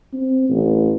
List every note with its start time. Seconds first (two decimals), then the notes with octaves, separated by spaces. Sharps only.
0.14 C4
0.50 A1